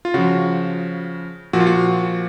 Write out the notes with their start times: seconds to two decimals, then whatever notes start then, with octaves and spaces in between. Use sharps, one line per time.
0.05 F4
0.14 C#3 F3 F#4
1.53 A#2 F3 F#4
1.60 F4
1.67 F#4